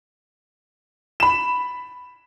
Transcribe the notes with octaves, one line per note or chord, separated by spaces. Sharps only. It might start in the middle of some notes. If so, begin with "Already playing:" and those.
B5 E7